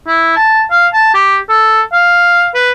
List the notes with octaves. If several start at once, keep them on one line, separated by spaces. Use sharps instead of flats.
E4
A5
F5
A5
G4
A4
F5
B4